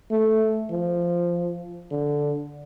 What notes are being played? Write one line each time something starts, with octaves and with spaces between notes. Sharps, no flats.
A3
F3
D3